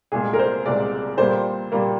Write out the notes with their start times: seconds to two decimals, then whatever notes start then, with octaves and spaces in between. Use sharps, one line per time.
0.12 C2 A#2 G#3 G#4
0.33 A#4
0.39 C5
0.66 C2 A#2 G#3 D5
1.18 A#2 G3 A#3 C5
1.72 A#2 G3 A#3